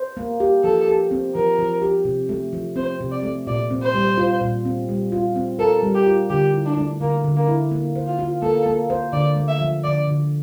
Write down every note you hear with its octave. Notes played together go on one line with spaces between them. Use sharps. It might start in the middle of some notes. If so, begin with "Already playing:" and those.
Already playing: C5
A#3
G4
F3 A4
G4
C4
F3 A#4
F3
G4
C3
A3
F3
C4 C5
C3
D5
A3
A#2 D5
C4
C5
G3
F4
A#2
C4
G3
F4
C4
A4 A#4
G3
G4
F4
D3 G4
E4
D4
A3
D3 A#3
D3
A#3
E4
A#3
C5
F4
F4
A#3 A4
A#3
C5
D3 D5
A3
E5
F3
D3 D5
D3